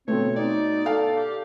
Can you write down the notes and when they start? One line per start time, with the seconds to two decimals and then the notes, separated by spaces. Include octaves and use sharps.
0.08 B2 A3 C4 C#5
0.36 D#4 D5
0.86 A4 F5
1.16 G4